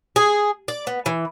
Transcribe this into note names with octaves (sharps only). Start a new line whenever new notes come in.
G#4
D5
B3
E3